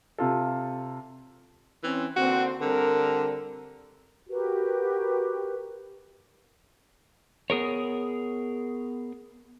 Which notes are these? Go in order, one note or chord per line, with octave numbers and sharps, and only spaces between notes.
C3 F4 A4
E3 C4 C#4
D3 A#3 C4 F#4
D3 G3 C4 A#4
F#4 G4 A#4 B4
B3 G#4 A#4 C#5